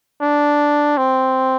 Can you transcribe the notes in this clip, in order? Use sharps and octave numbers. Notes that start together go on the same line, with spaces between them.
D4
C4